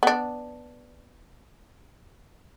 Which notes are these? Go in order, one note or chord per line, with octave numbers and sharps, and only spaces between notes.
B3 D4